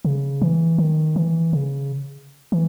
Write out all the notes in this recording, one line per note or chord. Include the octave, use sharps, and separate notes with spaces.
C#3
E3
D#3
E3
C#3
E3